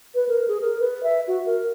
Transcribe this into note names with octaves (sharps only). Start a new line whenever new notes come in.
B4
A#4
G#4
A#4
B4
E5
F#4
A#4